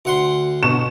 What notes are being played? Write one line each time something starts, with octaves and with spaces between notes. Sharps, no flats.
D2 F#5 C6
B2 C#6 E7